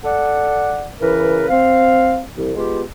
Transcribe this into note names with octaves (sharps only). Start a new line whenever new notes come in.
A4 D5 F#5
C#3 E3 A#4 B4
C4 F5
C2 E3
G#3 B3 F4 G4